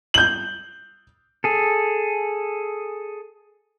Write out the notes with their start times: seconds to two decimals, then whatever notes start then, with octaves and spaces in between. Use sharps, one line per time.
0.14 G6 F#7
1.44 G#4 A4